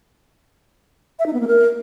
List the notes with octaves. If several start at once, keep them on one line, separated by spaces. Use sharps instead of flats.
E5
D#4
B3
A#3
A#4